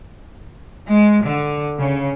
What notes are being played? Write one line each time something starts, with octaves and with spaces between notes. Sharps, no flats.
G#3
D3
C#3